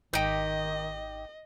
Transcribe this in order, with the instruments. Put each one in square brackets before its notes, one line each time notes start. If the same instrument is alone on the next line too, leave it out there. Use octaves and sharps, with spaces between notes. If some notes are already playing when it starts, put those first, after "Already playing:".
[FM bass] G#1 [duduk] D#3 [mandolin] D#4 G4 [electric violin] D#5